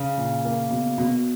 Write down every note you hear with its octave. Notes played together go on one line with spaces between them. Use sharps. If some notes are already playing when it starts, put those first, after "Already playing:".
Already playing: C#3
A#2
A#3
B2
B2